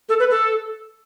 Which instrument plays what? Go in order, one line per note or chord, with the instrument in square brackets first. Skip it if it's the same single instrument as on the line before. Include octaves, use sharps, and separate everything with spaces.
[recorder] A4
B4
A4